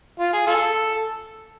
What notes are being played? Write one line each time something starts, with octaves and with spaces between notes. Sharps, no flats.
F4
G#4
F4 A4